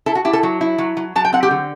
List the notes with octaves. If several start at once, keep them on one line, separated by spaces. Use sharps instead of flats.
E4 A4
F#4
E4 G4
A4
F#3
E4
F#3
F#3
F#3 A5
G5
C4 F#5
G4
D3